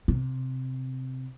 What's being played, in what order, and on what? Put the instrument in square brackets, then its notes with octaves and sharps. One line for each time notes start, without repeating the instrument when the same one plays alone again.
[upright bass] C3